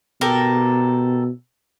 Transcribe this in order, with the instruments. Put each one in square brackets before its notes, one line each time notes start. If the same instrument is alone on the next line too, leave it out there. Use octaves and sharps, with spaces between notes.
[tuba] B2 [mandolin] G4 A4 A#4